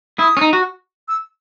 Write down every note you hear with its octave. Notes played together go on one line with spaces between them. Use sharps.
E4 D#6
C#4
D#4
F#4
E6